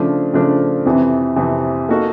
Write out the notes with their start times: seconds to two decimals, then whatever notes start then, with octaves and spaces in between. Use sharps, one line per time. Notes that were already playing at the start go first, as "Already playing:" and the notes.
Already playing: C#3 F3 A3 D4
0.33 C#3 F3 A3 D4
0.85 F2 C3 E3
1.36 F2 C3 E3
1.89 A#3 D#4 F#4 A4